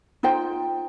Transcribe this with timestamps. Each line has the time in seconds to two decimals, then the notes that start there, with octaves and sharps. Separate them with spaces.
0.23 D#4 F4 C5 G5